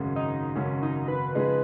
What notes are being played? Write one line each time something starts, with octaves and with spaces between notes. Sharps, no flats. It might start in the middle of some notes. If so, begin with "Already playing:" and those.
Already playing: G#1 F#2 C#3 G#3
D#4
G#1 F#2 C#3 G#3 C#4
D#4
B4
C#3 F3 G#3 D#4 G#4